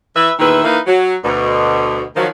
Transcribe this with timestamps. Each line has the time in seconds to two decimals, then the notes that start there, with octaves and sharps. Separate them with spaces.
0.16 E3 B4 E5
0.39 E2 A#2 D#3 B4 E5
0.64 E3 A#3 D#4 E4 B4 F5
0.86 F#3
1.24 D2 B2
2.16 D#3 F3 F#3